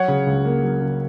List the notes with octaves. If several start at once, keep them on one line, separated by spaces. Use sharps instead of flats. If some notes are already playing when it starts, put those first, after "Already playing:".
Already playing: F#3 C#5 F#5
C#3
C#2
A#3
F#3
C#3